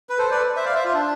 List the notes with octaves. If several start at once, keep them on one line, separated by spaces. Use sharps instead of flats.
B4
A4 C5
B4 D5
C5 E5
D5 F5
C5 E5
F4
D4